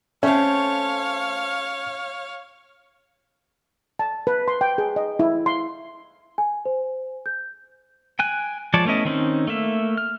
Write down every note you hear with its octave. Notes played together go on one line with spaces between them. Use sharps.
A3 C4 C#4 C#5 F5
A5
B4
C6
G5
G#4
D#5
E4
C6
G#5
C5
G6
G5 G#5 F#6
F3 G#3 C#5 D5 A5
A3 B3 C#4 E4 D#5
D#3 C4 C#4 D#4
A3 A#3 E5
F6